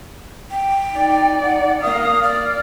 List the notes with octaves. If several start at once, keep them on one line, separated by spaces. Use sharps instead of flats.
G5
D#4 D5
F#5
A#3 F5 D#6
D5 F6